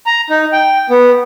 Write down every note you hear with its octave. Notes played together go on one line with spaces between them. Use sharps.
A#5
D#4
G5
B3